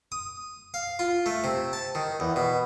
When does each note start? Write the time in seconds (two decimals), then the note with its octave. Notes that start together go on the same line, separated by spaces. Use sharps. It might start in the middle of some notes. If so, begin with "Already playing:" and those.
0.12 D#6
0.74 F5
0.99 F4
1.26 A3
1.44 C3
1.73 A5
1.95 D#3
2.20 E2
2.36 B2